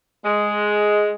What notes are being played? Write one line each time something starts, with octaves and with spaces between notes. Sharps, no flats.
G#3